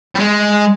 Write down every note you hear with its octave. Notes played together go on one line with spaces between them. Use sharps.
G3
G#3